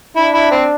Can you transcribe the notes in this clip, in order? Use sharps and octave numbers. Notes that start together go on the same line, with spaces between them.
D4 E4
E4
C4